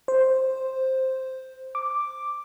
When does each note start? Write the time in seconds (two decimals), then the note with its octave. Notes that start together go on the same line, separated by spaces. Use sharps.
0.08 C5
1.75 D6